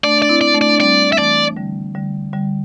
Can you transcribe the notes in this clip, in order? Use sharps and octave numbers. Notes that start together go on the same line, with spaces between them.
A3 D4 D5
D4 D5
C4 E4
D5
A3 D4
D5
D4
G3 C4 D5
E5
E3 A3 D5
D3 G3
D3 G3
D3 G3